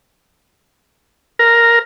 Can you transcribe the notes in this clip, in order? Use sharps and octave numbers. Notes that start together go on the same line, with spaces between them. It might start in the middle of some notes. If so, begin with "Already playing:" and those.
A#4